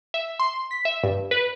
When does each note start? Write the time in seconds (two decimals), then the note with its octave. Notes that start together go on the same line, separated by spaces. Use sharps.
0.14 E5
0.39 C6
0.71 B6
0.85 E5
1.04 G2
1.31 B4